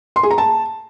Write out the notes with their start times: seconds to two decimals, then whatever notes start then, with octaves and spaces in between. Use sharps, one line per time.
0.16 C6
0.23 G#4
0.31 A#5
0.38 A5